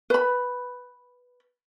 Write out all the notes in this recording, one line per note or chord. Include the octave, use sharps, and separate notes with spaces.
B4 B5